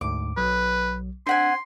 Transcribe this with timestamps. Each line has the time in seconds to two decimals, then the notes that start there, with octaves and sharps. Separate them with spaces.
0.01 D2 G#2 D6
0.37 B1 F#3 B4
1.27 C4 D4 F#5 G#5 C6 B6